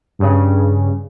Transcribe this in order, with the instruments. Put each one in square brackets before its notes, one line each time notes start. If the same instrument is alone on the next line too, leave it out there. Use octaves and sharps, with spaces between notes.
[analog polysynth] G2 C#3